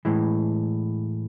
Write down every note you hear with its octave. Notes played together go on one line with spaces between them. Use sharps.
A2 E3 G#3